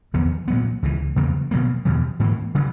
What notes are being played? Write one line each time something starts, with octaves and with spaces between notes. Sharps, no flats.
E2 D#3 F#3 B3
A#2 F#3 B3
C#2 C#3 E3
E2 C#3 F#3 A#3
B2 F#3 A#3
E2 B2 F#3
G#2 E3 A#3
C#3 F#3